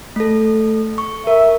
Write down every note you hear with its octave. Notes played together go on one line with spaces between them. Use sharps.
A3 A4
C#6
A#4 E5